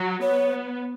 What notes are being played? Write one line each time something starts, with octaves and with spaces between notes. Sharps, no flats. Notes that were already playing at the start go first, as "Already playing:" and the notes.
Already playing: F#3
B3 C#5